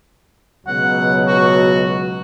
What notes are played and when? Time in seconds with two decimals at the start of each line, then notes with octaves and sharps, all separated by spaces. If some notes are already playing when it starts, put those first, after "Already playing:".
0.67 C#2 B2 F#3 F#5
1.27 F#4